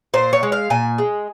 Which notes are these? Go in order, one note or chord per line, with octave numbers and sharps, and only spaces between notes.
A#2 C5
C#5
G#3
F5
A#2 G#5
G#3